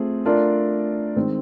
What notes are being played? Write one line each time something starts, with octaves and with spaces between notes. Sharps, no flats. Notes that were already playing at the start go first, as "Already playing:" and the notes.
Already playing: A3 C4 F4 G#4
A3 D4 F4 A#4 D5
D#3 G#3 C4